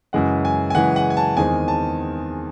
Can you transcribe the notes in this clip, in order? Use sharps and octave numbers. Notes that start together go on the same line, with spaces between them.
F#2 C#3 E3 G#3 F#5
G#5
G#5
F#2 C#3 E3 G#3 F#5
F#5
G#5
A5
E2 D#3 G#3 C4 G#5
A5